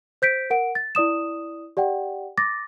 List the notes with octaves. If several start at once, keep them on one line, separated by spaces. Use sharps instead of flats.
C5 G6 B6 D7
A#4 F#5 D7
A6
E4 D5 D#6 E7
G4 D5 F#5 G5
D6 A6 A#6